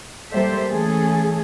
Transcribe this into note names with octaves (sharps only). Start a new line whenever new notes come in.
G3 A#3 G4 A4 C5 E5
E3 A3 C#4 G#4 A4